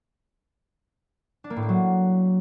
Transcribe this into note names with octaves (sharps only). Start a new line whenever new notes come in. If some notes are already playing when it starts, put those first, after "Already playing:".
D4
A#3
A2
A#3
F#3